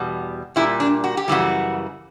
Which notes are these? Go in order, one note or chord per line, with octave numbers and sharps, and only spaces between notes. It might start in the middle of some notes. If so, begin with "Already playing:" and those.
Already playing: E2 B2 G3
A#2 G3 E4
D4
F#4
G4
F#2 C#3 E3 G3 F#4